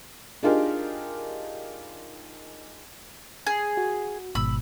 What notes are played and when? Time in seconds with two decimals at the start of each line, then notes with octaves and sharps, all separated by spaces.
0.43 D4 D#4 F4 G4 G#4 A#4
3.47 G#4
3.77 F#4
4.35 G#1 G#2 B2 B5 E6